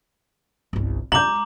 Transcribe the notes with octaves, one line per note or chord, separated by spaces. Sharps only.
G1 C2
G#3 A#5 D6 G6 F#7